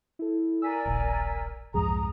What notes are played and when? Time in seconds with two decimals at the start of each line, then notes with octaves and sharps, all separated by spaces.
0.19 E4 A4
0.62 A#4 D5 G#5 E6 B6
0.85 D#1 A#1
1.74 C2 F2 G#2 G#4 A#5 D#6